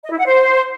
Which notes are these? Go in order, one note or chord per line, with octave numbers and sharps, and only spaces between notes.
D#5
E4
F#5
C5